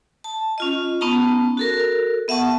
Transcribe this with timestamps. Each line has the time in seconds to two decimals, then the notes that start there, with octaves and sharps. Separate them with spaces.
0.24 A5
0.58 C#4 F4 D#5
1.01 B3 C#4 D#4 A5 A#5
1.57 F#4 A4 A#4
2.28 B3 E5 F#5 A5 C#6